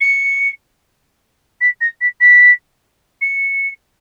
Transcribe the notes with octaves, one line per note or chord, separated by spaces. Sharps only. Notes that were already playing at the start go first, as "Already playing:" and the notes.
C#7
B6
A#6
B6
B6
C#7